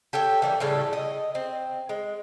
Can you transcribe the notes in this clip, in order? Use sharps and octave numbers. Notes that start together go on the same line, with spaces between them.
G4 A4 C#5 G5
E3 G3 A#3
A2 C#3 G3 A4
D#5
C4
G#3